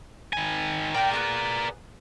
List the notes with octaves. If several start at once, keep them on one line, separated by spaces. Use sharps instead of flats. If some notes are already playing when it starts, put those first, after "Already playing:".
D#3 G#5
A#4 D5 G5 A#5 G6
B3 D#4 G#4